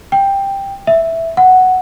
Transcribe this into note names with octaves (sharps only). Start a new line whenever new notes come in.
G5
E5
F#5